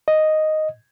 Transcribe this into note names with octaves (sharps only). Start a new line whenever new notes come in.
D#5